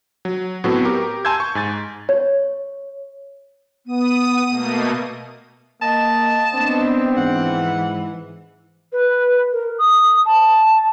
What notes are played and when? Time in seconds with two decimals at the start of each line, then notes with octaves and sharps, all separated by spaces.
0.25 F#3
0.64 A2 F#3 B3 C4 F#4 A4
0.85 G4 A#4 D6
1.25 G#5 A5 C6 E6 G6 G#6
1.40 C#6
1.55 G#2 G#5 A6
2.09 C#5
3.86 B3 D#6 D#7
4.49 B2 A3 A#3
5.82 A#3 D#5 A5
6.54 B3 C4 D4
7.17 G#2 E3 F#5
8.92 B4
9.52 A#4
9.78 D#6
10.25 A5